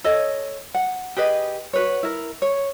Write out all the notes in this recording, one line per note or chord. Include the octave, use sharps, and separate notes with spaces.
A4 C#5 D#5
F#5
G4 G#4 B4 D#5
F#4 B4 C#5
E4 A#4
C#5